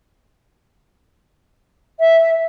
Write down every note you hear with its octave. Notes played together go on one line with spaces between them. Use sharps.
E5